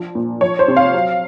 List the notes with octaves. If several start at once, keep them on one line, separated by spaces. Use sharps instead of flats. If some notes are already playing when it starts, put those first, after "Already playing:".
Already playing: F3 D4
A#2
F3 C#5
C5
C3
F5
F#3